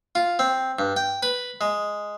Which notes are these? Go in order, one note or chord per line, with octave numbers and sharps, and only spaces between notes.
F4
C4
G2
G5
B4
G#3